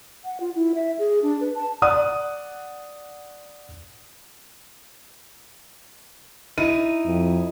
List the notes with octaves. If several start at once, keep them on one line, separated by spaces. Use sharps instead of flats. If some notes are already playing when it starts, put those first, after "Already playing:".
F#5
F4
E4
E5
G#4
D4
B4
A5
D5 F#5 D#6
D#4 E4 D#7
F2